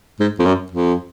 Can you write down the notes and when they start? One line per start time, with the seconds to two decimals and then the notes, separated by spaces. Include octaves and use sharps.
0.20 G#2
0.39 F2
0.45 F#2
0.71 F2